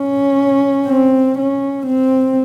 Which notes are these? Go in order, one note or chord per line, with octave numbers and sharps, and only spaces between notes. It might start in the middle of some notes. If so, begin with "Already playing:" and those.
Already playing: C#4
C4
C#4
C4